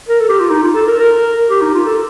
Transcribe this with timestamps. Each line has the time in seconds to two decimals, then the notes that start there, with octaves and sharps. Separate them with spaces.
0.09 A#4
0.20 A4
0.29 G4
0.40 F4
0.50 D#4
0.63 F4
0.74 A4
0.87 A#4
0.99 A#4
1.49 G4
1.61 D#4
1.74 F4
1.86 A4